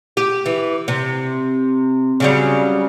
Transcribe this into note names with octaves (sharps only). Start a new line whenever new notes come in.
G4
E3
C3
C#3 F#3 G3